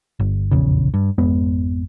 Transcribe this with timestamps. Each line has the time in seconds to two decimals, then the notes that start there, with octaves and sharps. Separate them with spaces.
0.20 G1
0.51 F1 A#1 E2 C#3
0.94 G2
1.18 G#1 F2 G#3 B3